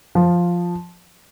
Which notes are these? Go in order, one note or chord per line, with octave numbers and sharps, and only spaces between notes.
F3